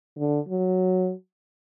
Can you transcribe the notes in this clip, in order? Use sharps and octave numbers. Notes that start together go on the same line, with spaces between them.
D3
F#3